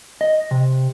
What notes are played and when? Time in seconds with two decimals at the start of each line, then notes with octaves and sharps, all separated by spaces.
0.21 D#5
0.51 C3